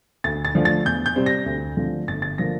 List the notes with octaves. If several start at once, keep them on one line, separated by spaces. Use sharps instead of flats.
D2 A6
A6
D3 F3 A3 D4
A6
E2 G6
G6
C3 G3 C4
A#6
D2
D3 F3 A3 C4
G1 A6
A6
D3 F3 A#3 A#6